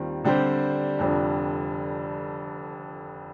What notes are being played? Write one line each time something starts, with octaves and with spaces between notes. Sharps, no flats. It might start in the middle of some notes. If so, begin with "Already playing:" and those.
Already playing: D#2 D#3 G3 C4 F4
D3 G3 C4 G4 C5
F1 F2 D3 G3